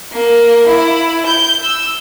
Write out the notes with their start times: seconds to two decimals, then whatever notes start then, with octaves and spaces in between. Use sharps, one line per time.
0.13 A#3
0.67 E4
1.27 G6
1.63 E6